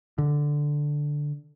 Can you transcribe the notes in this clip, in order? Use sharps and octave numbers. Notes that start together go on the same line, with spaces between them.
D3